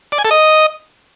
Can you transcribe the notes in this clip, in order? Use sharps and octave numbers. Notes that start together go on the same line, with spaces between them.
D5
G#5
A4
D#5